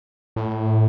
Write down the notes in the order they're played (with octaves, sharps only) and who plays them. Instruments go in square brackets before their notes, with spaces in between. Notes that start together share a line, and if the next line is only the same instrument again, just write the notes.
[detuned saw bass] A2